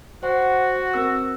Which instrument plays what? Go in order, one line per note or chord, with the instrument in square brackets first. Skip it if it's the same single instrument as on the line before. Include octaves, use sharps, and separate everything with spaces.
[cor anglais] F#4 [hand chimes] C5 F#5
[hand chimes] C4 A#4 E6